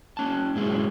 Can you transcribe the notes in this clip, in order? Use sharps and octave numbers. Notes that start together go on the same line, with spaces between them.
A#3 C#4 A5
G#2 F#3 G#3 A#3 E4 G#4